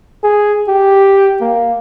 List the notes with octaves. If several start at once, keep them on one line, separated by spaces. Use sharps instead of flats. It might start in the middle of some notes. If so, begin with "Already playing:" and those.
G#4
G4
A#3